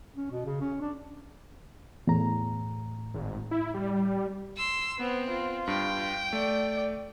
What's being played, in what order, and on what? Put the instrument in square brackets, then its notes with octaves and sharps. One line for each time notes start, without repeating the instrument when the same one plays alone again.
[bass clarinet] C#4
B2
C#3
C#4
D4
[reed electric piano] E2 A2 A#5
[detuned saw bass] G#1
E4
G3
[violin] C6 E6
[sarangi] B3 [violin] C4
[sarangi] F4
[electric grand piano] G2 [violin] G5
[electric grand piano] A3 [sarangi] D5